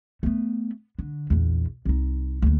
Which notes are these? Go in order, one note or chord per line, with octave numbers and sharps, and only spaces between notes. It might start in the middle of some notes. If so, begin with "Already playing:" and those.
A3 B3
D3
A#1 E2
C2 D#4
D2 A#3